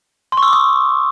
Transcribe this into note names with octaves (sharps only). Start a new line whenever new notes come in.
C6
C#6
E6
D6
D#6